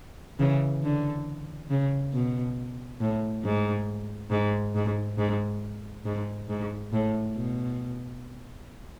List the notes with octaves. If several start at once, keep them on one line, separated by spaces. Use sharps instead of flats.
C#3 E3
D3
C#3
B2
A2
G#2
G#2
G#2
G#2
G#2
G#2
A2
B2